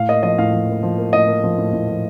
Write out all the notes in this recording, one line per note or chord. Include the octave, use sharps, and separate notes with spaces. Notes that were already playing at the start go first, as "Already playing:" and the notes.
Already playing: A2 F5
A#3 D#5
F3 D#5
A2 F5
F3
A#3
F3
A#3
A2 D#5
A#3
F3
A2
A2
F3